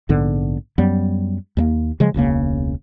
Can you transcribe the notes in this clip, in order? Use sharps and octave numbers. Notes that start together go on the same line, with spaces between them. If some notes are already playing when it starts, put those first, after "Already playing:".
A#1 G#2 D3 B3
F#2 F#3 G3 B3
D#2 G3 A#3
C#3 F3 F#3 G#3
E1 C#2 C#3 A#3